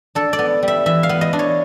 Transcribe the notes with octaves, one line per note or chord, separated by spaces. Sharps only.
D4 A4
D5
B3
G3
E5
E3 E5
F5
B3
D#5
D4
C#5